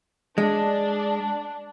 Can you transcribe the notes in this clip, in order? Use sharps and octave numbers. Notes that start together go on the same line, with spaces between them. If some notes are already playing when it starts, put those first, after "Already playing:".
G#3 D4